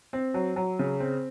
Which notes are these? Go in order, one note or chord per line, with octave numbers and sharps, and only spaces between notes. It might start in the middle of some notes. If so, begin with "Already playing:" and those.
C4
F#3
F#3
C#3
C4